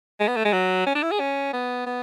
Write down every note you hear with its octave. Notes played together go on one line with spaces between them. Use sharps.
G#3
B3
A3
G#3
F#3
C#4
D4
E4
G#4
C#4
B3
B3